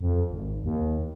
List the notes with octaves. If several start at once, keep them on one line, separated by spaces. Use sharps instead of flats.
F2
G#1
D#2